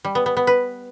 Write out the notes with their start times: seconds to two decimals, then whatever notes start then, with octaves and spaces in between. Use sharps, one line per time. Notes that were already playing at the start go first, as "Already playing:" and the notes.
0.05 G3
0.15 B3
0.26 B3
0.37 B3
0.47 B4